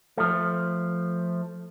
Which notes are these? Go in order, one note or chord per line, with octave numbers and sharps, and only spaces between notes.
F3 A3